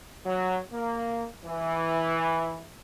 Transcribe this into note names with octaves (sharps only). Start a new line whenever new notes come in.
F#3
A#3
E3